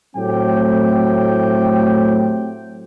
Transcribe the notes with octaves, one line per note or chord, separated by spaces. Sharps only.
A2 F#3 A3 C4 G4 G5